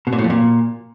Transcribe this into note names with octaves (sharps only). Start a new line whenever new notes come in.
B2
A#2
A2
F2
A#2